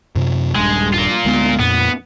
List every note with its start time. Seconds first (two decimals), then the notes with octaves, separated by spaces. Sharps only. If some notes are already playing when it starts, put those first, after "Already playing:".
0.15 F#2 C3
0.56 D#1 G2 G#3
0.93 F4 A#4
1.25 D2 G#3 B3
1.59 F2 A#2 B3